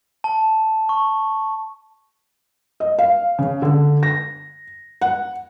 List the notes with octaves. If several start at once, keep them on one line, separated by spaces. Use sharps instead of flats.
A5
C#6
D#5
F5
C#3
D3
A#6
F#5